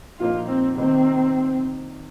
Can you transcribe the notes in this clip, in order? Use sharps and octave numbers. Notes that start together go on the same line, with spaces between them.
A#2 F3 A#3 D#4 F4
C4
C3 D#3 A#3 C4 D#4